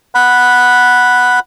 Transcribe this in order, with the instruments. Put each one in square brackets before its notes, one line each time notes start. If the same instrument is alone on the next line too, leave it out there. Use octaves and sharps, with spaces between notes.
[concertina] F#5 B5